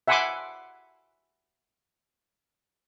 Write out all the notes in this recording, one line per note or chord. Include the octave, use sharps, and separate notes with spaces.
E5 F#5 G#5 B5 C6 D6